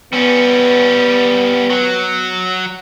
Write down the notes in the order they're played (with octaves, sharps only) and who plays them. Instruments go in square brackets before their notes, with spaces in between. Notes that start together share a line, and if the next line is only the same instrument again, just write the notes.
[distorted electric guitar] G3 C#4 [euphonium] B3
[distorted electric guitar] F#3